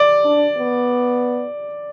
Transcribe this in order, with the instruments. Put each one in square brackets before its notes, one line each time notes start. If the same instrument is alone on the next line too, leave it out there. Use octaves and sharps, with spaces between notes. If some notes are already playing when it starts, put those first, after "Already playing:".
Already playing: [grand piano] D5
[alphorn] D4
B3